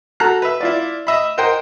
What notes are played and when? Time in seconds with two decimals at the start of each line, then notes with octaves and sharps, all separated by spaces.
0.20 F#4 A4 A#5 F#6
0.42 B4 E5
0.61 E4 F4 D5
1.07 D#5 E5 B5
1.38 A#4 C5 D#5 F#5 G5